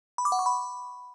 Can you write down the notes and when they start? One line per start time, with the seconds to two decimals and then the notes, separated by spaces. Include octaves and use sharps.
0.18 B5
0.25 D6
0.32 F#5
0.39 C#6
0.46 B5